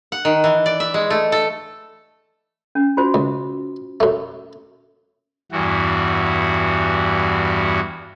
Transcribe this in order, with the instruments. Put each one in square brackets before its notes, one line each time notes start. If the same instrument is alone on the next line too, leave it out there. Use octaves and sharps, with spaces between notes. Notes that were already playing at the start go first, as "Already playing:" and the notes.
[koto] F#5
D#3
E3
D5
E5
G#3
A3
A4
[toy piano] C#4
F4 F#4 C5
[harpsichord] C#2
F#2 A3
[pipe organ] E2 G2 E3 F#4